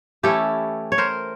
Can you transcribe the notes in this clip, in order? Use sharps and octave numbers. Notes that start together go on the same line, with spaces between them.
E3 A3 C#4 E4 G4 A4
C#5
A#4 C5